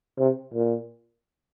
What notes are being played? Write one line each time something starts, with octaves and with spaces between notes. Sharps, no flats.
C3
A#2